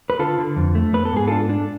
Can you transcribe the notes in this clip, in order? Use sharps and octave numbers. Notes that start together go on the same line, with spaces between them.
B4
D3 F4 A4
D3
F2
A3
B3 B4
A4
G#2 G#4
D4 F4 A4
D4